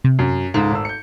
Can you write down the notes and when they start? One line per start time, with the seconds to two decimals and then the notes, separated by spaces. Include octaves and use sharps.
0.04 C3
0.19 F#2
0.54 C#2 G#2 A3
0.71 G#1 E6
0.85 G6 C#7